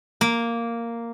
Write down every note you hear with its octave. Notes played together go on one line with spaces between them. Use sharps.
A#3